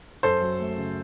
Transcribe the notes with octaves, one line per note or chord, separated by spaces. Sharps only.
F#2 A4 C5
F#3
A3
C#3